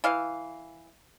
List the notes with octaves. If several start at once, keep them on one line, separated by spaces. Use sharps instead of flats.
E3 F5